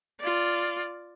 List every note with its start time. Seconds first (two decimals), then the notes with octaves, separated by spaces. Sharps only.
0.20 F4 D5